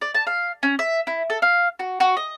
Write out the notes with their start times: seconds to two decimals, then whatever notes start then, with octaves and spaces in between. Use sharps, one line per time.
0.01 D5
0.14 A5
0.27 F5
0.63 C#4
0.79 E5
1.07 E4
1.30 A4
1.42 F5
1.79 F#4
2.00 F#4
2.17 D#5